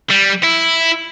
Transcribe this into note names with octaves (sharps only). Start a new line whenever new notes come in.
G3
E4